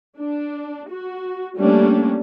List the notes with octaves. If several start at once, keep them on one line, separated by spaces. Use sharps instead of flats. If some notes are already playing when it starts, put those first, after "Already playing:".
D4
F#4
G3 A3 A#3 C#4 D4